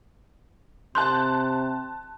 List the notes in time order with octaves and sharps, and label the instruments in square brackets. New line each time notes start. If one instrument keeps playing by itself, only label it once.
[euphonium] C3 [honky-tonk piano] A5 F#6 G6 [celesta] C6